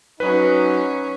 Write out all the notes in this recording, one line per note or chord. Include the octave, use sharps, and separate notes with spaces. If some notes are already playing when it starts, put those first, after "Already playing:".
F#3 C#4 D#4 B4